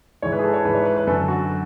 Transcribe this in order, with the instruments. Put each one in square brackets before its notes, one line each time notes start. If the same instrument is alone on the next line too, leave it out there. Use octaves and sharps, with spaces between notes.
[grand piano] G#2 E3 C#5
B4
G#4
A4
C#5
G#2 E3 B4
C#5
B4
B4
F#2 A4
D3
F#4